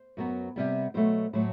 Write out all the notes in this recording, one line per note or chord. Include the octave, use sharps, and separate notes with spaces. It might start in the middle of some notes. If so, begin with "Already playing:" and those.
Already playing: C5
F#2 F#3 B3
C3 G3 B3
B2 F#3 A3 C5
A2 F#3 A3 C5